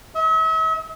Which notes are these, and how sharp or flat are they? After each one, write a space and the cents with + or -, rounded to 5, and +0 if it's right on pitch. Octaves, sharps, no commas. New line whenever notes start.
E5 -45